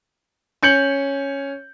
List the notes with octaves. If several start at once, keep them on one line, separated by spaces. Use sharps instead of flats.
C#4 G6 C#7 F#7